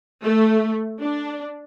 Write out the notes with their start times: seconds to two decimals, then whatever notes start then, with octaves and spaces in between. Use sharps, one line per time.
0.23 A3
1.00 D4